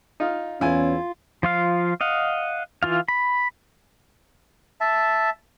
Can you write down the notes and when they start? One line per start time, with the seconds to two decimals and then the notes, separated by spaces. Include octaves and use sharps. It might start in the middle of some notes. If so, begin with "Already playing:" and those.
0.20 D#4 F4
0.61 E2 C#4 E4 F4 G#5
1.43 F3 F4 F5
2.01 D#5 F5 F#5
2.83 E3 F4 F5
3.08 B5
4.81 E5 A5